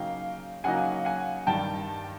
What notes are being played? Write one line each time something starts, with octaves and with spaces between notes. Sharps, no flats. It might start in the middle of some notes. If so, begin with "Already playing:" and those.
Already playing: C#3 F#3 A#3 D#4 F5 G5
C#3 F#3 A#3 D#4 F#5 G#5
F#5 G#5
G2 D#3 G3 G5 A5